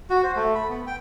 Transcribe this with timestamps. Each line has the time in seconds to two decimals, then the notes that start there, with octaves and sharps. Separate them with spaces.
0.10 F#4
0.23 C5
0.35 A3
0.55 B5
0.69 B3
0.87 G5